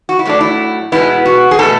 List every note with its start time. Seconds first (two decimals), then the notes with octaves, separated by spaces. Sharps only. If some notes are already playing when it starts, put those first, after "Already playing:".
0.09 F#4
0.19 E4
0.25 A2 F#3 A3 D4
0.41 E4
0.92 B2 G#3 B3 E4
1.25 F#4
1.51 G#4
1.59 B2 A3 A4